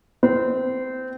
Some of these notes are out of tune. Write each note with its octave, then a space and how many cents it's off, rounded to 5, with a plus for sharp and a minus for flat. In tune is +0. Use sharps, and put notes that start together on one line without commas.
C4 -20